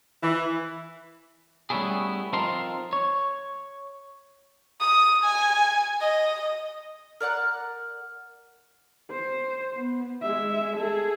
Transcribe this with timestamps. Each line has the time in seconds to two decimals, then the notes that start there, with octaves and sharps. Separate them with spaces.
0.23 E3
1.70 G3 A3 B3 C#4 E4 G#4
2.33 F3 C4 D#4 A4 A#4 C6
2.93 C#5
4.80 D#6
5.24 G#5
6.01 D#5
7.20 A#4 D5 F#5 F#6
9.11 C5
9.74 B3
10.22 G#3 E5
10.76 G#4 A4